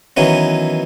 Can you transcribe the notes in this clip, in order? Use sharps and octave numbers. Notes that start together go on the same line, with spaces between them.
D#3 E3 F#3 B3 C#4